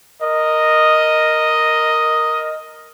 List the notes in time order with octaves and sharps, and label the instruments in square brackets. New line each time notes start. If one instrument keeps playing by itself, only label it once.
[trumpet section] A#4 D#5